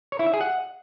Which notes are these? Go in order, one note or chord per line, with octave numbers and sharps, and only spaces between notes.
C#5
E4
E5
G#4
F#5